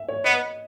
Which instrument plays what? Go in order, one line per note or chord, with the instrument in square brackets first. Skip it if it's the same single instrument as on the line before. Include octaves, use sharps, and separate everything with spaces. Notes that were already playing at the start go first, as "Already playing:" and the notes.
Already playing: [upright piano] E5
C#5
[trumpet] B3 [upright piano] D#5